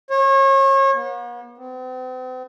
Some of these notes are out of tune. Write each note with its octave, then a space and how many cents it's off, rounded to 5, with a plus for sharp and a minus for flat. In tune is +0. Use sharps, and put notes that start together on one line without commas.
C#5 -35
B3 -45
C4 -45